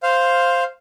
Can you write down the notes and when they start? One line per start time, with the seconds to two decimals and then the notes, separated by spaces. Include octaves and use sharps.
0.03 C5 F5